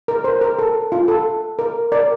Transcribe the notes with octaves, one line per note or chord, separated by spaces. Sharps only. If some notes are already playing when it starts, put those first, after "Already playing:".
A#4
C5
A#4
A4
F4
A4
A#4
A#4 D5